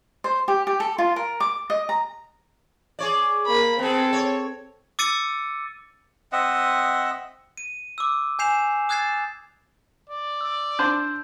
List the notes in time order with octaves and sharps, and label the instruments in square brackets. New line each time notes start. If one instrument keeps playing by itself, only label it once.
[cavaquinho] C5
G4
G4
A4
F4
A#4
D6
D#5
A#5
[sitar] G#4 C#5 D5
[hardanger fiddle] A#3 B5
[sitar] B3 G#4 [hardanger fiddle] C4 A4
[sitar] C#5
[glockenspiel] D6 E6 A6 C#7 D#7
[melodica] C4 D#5 E5 F#5
[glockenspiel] D#7
D6 E6
G#5 G6 C7 E7 F7
D#6 F#6 G#6 A6 C7 E7
[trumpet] D5
[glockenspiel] E6
[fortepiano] D4 C5 [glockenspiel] G6